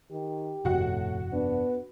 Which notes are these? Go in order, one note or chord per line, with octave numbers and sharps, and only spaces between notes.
D#3 G4
G1 F2 A2 C3 F#4 F#5
B3 D4